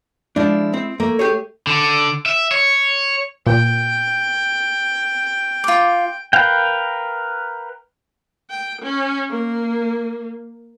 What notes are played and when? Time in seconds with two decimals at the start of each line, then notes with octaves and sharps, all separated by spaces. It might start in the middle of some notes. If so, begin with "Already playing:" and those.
0.36 F3 G#3 D4 E4
0.74 C4
1.00 A3 A#3
1.19 G4 G#4 C#5
1.67 D3
2.26 E5
2.51 C#5
3.46 A#2 G5
5.64 F4 D6
6.33 A#4 B4 F5 G5
8.50 G5
8.82 C#4
9.29 A#3